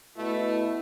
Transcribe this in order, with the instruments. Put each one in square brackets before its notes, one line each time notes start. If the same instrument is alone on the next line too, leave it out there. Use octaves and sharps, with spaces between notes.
[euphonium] B2 [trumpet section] A3 [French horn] E4